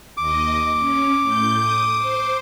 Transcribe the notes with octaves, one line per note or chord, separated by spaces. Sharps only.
D#2 D#5 D6
C#4
A2 G6
D#6
C5